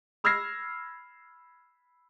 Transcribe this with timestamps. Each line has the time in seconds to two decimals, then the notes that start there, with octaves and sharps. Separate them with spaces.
0.24 B5 E6 F6 G#6 A#6 C7